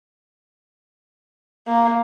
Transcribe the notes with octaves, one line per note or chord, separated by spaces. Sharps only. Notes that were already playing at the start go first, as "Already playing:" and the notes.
A#3